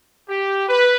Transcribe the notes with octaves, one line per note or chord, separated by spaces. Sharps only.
G4
B4